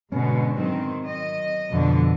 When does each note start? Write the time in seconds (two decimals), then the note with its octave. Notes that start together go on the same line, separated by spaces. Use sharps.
0.12 G#2 B2 D3 B3 C#4
0.57 D#3 F#3 C4
1.04 D#5
1.72 F2 B2 D3 F3